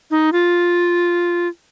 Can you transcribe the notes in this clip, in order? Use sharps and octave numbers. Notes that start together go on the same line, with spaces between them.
D#4
F4